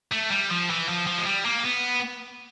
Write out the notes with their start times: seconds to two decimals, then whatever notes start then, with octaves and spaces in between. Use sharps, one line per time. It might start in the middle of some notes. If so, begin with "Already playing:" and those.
0.12 A3
0.31 G3
0.50 F3
0.70 E3
0.88 F3
1.07 F3
1.18 G#3
1.26 G3
1.45 A#3
1.64 B3